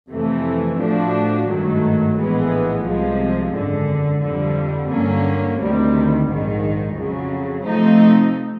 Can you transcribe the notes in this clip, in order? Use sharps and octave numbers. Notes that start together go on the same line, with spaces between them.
F2 C3 E3 A3
A2 F3 A3 D4 F#4
G#1 G2 D#3 F#3 A3
A#1 A2 E3 G#3 B3
C2 C3 F3 G#3
G#1 F#2 D3
F2 D3 G3
G2 D3 F#3 A#3 C#4
D2 C3 D#3 G3
A#1 G#2 D#3
F2 C#3 F#3
C3 F3 A3 C4 D#4